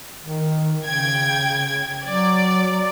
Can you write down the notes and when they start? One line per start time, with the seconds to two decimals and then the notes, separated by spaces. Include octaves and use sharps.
0.22 D#3
0.84 C#3 G5 G#6
2.05 F#3 D5